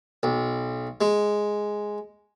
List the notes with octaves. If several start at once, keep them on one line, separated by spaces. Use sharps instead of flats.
B1
G#3